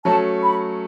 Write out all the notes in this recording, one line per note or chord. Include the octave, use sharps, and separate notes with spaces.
F#3 A3 C#4 A5
B5